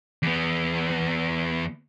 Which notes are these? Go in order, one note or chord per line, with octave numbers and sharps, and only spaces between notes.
E2 B3